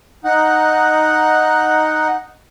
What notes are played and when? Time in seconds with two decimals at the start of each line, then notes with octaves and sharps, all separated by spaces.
0.24 D#4 F#5